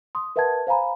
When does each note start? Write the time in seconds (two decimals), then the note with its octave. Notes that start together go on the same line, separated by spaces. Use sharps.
0.15 C6 D#6
0.36 A#4 B4 E5 F#5 A5 G#6
0.67 C5 F5 G#5 A#5 B5